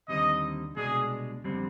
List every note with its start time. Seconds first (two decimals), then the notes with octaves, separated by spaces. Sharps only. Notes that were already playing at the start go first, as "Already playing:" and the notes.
0.08 D#2 D3 G3 C4 D#4 D#5
0.76 C2 B2 G#3 D4 G#4
1.44 F2 D3 G3 C4